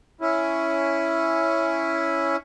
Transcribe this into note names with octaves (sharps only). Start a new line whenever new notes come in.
C#4 E4